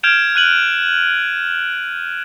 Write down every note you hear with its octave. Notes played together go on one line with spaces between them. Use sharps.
F6 G6 G#6 D7 E7 F7
F#6 D#7 F#7